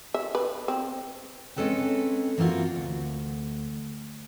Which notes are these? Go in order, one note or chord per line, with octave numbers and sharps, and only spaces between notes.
E5
B4
C4
G#3 C4 C#4 A4 B4 G5
E3 A#3 C4 F4 F#4
D2